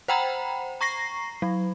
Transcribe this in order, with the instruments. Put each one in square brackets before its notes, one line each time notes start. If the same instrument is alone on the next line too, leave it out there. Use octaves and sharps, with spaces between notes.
[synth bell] C5 F#5 G5 A#5 B5
A#5 C#6 A#6 C7
F#3